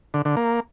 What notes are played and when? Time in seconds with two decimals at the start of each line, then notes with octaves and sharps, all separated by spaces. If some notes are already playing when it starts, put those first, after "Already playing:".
0.14 D3
0.25 D3
0.37 A#3